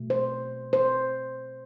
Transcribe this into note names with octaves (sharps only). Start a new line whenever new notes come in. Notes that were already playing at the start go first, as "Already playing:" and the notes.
Already playing: B2 A3
C5
C5